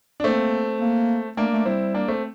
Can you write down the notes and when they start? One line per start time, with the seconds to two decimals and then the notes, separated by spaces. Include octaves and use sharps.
0.20 D4
0.24 A3 A#3 C4
0.81 A#3
1.37 A3 A#3 D4
1.52 A3
1.65 G3 C4 E4
1.94 A#3 D4
2.08 A3 C4